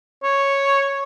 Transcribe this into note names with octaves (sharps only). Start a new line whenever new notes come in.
C#5